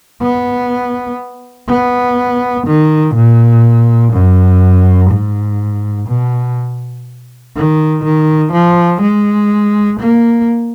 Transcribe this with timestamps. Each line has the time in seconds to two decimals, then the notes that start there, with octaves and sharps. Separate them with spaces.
0.22 B3
1.69 B3
2.67 D#3
3.15 A#2
4.13 F#2
5.10 G#2
6.08 B2
7.55 D#3
8.04 D#3
8.53 F3
9.01 G#3
10.00 A#3